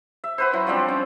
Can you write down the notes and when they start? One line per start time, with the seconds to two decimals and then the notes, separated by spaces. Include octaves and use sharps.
0.24 E5
0.38 F#4 B4 C5
0.53 F#3 E4
0.67 F3 G3 C4 D4
0.88 C#4